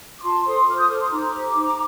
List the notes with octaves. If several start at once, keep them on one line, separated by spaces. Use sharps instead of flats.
D6
F4 A5 C6
A4 C5 C6 D#6
F4 D6 F6
D#6 G6
A4 C5 D6 F6
C6 D#6
D#4 A#5 D6
G4 C5
D#4